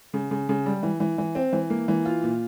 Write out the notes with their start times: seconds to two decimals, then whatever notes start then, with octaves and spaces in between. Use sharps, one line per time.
0.14 C#3
0.31 C#3
0.49 C#3
0.66 G3
0.83 E3
1.00 E3
1.18 E3
1.35 C4
1.53 E3
1.70 A#3
1.88 E3
2.05 F4
2.23 A#2